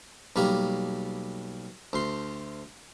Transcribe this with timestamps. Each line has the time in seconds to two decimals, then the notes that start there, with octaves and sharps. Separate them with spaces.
0.36 B1 G3 A#3 G4
1.93 D2 C6